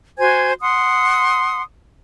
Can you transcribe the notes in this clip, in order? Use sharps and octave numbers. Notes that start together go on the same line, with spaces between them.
F#4 C5 G#5 G#6
F#5 C6 D#6